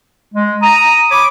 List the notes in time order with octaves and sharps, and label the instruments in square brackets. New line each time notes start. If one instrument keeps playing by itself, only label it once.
[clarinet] G#3
[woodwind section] A#5 [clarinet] D#6
[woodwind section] C#5 B5 D6